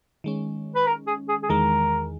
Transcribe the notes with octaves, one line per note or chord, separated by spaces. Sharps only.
D#3 G#3 C#4
B4
A#4
G#4
G#4
G#4
E2 D#3 G#3 A#4